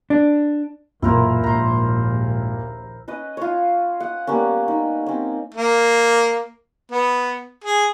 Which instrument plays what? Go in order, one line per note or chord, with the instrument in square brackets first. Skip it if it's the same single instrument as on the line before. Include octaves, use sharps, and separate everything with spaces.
[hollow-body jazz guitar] D4
[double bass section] B1 [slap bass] F#2 E3 A#3 [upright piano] A#2 [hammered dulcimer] E4 A#4 C5
[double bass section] A#1 D#2 [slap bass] G#2 [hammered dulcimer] C5 A#5
[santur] C#4 B4 D#5
F4 C#5
F#5 D#6
G3 A#3 B3 C#4
D#4
C4 C#4
[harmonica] A#3
B3
G#4